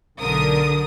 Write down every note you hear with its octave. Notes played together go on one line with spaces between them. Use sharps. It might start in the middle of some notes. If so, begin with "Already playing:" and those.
B1 D3 A#4 D#6